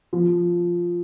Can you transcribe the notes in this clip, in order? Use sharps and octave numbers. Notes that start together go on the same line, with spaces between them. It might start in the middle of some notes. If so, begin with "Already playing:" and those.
F3